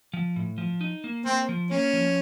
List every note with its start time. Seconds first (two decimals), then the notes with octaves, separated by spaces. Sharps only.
0.13 F3
0.36 A2
0.58 F3
0.81 D#4
1.04 A#3
1.26 A#3 C4
1.49 F3
1.71 A#3 C#4
1.93 F3